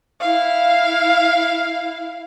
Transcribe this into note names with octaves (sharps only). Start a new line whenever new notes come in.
E4 F5